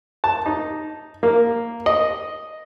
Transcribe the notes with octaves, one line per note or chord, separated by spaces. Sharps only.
A5
D#4
A#3
D#5